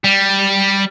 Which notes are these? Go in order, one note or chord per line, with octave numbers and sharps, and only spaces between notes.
G3